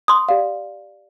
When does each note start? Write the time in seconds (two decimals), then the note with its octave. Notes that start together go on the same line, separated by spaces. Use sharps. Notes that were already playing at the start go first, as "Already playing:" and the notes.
0.08 C6 D#6
0.29 G4 D5 F5